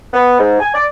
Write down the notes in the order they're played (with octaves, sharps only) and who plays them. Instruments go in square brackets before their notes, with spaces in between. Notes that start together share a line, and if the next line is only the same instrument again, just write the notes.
[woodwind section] B3
G#2
G#5
D5